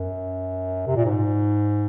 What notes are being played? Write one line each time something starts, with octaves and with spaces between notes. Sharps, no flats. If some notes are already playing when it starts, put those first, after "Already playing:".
Already playing: F#2
C3
A#2
G#2